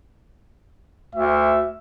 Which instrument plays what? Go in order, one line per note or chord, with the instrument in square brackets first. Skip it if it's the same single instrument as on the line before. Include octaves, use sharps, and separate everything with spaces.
[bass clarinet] D2 [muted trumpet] E5